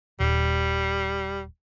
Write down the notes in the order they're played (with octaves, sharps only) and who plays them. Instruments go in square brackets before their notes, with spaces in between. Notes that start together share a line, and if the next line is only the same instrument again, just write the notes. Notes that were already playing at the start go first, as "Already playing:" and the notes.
[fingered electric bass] D#1 [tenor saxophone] G3